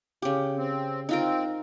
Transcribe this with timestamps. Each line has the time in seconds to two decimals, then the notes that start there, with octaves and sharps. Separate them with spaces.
0.22 C#3 G4
0.57 C4
1.09 C4 D#4 F4 A#4